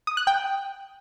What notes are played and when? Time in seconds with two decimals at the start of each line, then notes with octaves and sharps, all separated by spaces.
0.07 D#6
0.17 F#6
0.27 G5